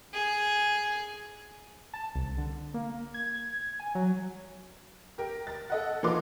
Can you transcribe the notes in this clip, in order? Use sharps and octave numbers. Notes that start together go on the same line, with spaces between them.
G#4
A5
C2
D3
A#3
G#6
G#5
F#3
G4 A#4
A6
A4 D#5 F#5
E3 F3 A#3 D#4 C6 D6